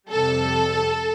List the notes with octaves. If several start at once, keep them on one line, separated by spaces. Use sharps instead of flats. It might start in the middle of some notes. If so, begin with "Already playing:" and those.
F2 C3 G3 A4